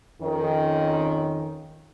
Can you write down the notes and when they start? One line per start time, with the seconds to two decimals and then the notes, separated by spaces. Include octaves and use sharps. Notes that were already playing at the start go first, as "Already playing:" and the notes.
0.21 F2 D#3 C#4